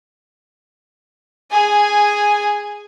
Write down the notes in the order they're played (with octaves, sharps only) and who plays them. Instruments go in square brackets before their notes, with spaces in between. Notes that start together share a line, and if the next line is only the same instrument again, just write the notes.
[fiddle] G#4 G#5